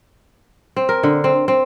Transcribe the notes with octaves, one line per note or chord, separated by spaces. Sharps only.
C4
A#4
D3
C4
C4